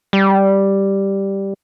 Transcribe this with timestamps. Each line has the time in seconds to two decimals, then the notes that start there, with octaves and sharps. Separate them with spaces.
0.13 G3